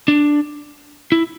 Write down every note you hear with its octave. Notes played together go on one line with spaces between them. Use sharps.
D4
E4